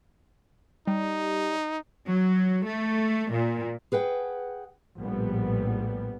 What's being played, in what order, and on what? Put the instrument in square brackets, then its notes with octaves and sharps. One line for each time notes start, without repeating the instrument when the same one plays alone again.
[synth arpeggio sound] G3 [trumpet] D#4
[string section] F#3
A3
A#2
[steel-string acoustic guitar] G#4 B4 F#5 G5
[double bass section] A#1 A2 G3 B3